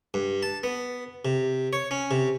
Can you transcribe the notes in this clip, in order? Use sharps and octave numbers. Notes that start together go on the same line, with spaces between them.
G2
A5
B3
C3
C#5
C#4
C3